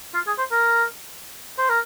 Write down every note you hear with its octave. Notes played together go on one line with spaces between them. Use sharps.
F4
G#4
C5
A#4
C5
A#4